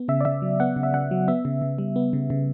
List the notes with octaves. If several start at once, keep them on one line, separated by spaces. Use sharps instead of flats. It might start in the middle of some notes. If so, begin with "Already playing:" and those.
Already playing: B3
C#3 E5
D5
C#3 E5
F#3
B3 F#5
C#3
E5
C#3 F#5
F#3
B3 E5
C#3
C#3
G3
B3
C#3
C#3